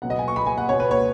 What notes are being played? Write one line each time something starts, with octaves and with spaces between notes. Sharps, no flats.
B2 F#3 B3 F#5
D#5
G#5
C#6
B5
G#5
F#5
B2 B3 C#5
B4
C#5